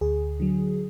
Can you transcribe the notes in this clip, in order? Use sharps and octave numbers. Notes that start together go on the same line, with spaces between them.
D2 G#4
D3 F#3